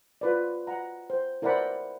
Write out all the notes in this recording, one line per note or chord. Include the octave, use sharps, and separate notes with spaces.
F4 B4 D5
F#5 A#5
C5
E4 A#4 C5 D5 F#5 B5